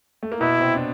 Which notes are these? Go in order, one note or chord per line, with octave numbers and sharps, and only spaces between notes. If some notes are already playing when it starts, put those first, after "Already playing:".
A3
A#3
B2 B3 E4
C3 C4
D4